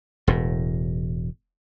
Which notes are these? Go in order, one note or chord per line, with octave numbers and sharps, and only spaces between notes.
E1 A2